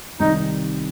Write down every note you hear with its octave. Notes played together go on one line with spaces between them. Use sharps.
C2 C3 D#3 G3 D#4